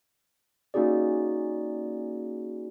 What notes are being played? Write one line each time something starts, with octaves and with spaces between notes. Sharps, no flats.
A#3 C#4 D#4 F#4 G#4 D5